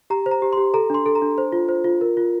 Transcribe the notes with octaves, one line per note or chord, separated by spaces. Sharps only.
G4 A#5
C5
A#5
G4
G4 C6
A4 A#5
D4 C6
A4
A#5
D4
C5
F4
C5
F4
A#4
F4